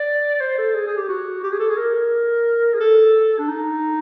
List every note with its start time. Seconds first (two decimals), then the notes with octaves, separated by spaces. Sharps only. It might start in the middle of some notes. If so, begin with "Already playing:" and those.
Already playing: D5
0.41 C5
0.58 A4
0.75 G#4
0.87 G#4
0.97 G4
1.09 F#4
1.43 G4
1.52 G#4
1.60 A4
1.69 G#4
1.77 A#4
1.95 A#4
2.74 G#4
2.80 A4
3.38 D4
3.49 D#4